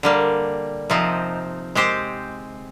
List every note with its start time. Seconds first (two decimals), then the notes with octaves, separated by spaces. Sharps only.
0.03 D3 G3 A#3
0.90 C3 F3 C4 D#4
1.75 G#3 C4 G4 C5